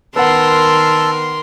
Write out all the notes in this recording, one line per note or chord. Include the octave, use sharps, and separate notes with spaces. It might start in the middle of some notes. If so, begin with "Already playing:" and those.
D#3 B3 A#4 F#5 A5 C6 E6